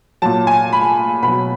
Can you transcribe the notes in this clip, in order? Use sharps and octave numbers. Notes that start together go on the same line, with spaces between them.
A#2 F#3 A5
G#5
B5
B2 F#3 B5